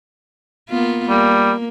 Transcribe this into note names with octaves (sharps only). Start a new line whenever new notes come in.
A#3 B3 F4
G3 A#3